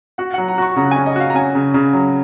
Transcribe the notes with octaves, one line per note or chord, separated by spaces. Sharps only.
F#4 F#5
F#3 F#5
A#5
F#4 C#6
C#3 A#5
C#4 G#5
D#5
F#4 F5
A#5
C#4 G#5
C#3
C#3
F#3